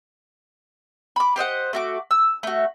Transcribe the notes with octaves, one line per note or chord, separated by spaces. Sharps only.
B5 D6
G4 C5 D#5 F#5
A3 F#4 D6
E6
A3 F#4